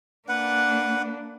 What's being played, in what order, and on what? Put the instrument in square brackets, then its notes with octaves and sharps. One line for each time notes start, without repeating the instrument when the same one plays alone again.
[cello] A#3 D4 [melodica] B4 F#5